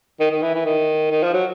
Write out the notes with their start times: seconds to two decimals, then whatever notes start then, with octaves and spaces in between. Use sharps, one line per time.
0.20 D#3
0.31 D#3
0.42 E3
0.55 E3
0.66 D#3
1.11 D#3
1.23 F3
1.33 F#3